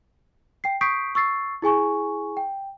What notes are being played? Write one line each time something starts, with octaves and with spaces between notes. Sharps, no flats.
G5 C7
C#6 D#6 G6 B6 C7 D7
C#6 E6 A6 C7
E4 G#4 G#5 C#6
G5